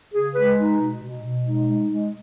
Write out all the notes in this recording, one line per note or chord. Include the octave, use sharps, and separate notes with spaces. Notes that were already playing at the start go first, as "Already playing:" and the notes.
C#3 G#4
G#3 B4
B2 D#4
B2
B2
B2
G#3 D#4
G#3
G#3